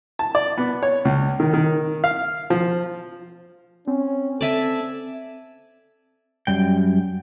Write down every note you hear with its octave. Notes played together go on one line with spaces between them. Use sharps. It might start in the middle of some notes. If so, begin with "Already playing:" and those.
A5
D5
B3
C#5
C#2
D#3
D#3
F5
F3
C4 C#4
A4 D5 E5 G#5
F#2 G3 G5